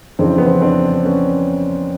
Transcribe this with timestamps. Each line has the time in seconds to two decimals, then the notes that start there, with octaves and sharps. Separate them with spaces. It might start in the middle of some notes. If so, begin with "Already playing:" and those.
0.19 F2 C#3 E3 C4 D4
0.38 B3
0.46 C4
0.55 C#4
0.62 C4 D4
1.05 B3 C#4